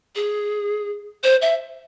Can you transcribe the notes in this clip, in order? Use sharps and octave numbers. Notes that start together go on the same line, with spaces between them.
G#4
C5
E5